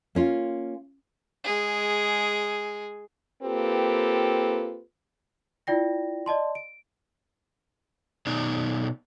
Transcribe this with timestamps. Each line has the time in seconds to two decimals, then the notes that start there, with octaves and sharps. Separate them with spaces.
0.15 A#3 C#4 F4
1.44 G#3 G#4
3.43 A#3 C4 F4 G4 A4 B4
5.67 E4 F4 D5 G5 A#6
6.26 D5 D#5 A5 C6
6.55 D7
8.27 B2 D#4 D5